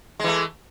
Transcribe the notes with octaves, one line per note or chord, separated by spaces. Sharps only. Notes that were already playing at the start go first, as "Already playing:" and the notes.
E3 G#3 A3